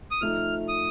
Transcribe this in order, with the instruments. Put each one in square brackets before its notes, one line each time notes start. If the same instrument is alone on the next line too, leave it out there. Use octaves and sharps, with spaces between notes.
[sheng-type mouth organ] D#6
[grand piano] F3 A3 D#4 [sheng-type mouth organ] F6
[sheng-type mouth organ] D#6